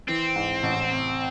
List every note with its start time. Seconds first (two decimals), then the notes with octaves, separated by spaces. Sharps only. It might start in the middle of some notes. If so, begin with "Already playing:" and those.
0.08 E3 C4
0.36 G#2
0.63 A1
0.91 C3